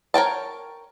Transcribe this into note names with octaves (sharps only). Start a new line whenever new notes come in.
A#4 C#5 G5 A5